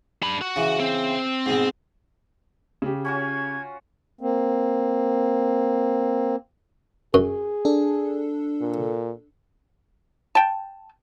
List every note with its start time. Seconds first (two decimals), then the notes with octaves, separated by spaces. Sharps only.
0.23 D4 B5
0.42 F#4
0.56 C#3 E3
0.80 C4
1.46 G#2 B2 G#3
2.82 C#3 G4
3.05 C#4 F4 F#4 G#6
4.21 A#3 C4
7.14 F#2 G#4
7.65 D4 A4
8.61 A#2
10.35 G5 A5